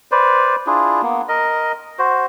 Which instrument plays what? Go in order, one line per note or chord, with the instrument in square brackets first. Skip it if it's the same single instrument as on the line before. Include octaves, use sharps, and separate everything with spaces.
[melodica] B4 C5 D5
D4 E4 F4 G#4
A#3 B3
A#4 D#5
F#4 C5